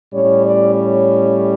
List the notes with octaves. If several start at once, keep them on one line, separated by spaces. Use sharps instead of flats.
A2 G3 C#4 C#5
D5
C#5